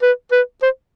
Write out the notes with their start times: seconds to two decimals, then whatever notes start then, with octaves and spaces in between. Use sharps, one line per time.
0.02 B4
0.32 B4
0.63 C5